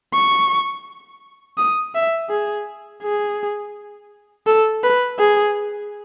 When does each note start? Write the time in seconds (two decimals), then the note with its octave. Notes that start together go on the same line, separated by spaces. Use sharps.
0.14 C#6
1.58 D#6
1.95 E5
2.30 G#4
3.03 G#4
4.47 A4
4.84 B4
5.19 G#4